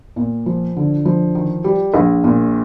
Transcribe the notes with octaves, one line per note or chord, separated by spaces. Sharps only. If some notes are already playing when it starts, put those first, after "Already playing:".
A#2
F3
D3
F3
D#3
G3
A#1
A#2